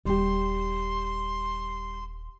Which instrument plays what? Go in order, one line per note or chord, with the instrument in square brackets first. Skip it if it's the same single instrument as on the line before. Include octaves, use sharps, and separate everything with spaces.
[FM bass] D#1 [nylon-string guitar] G3 G4 [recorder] C6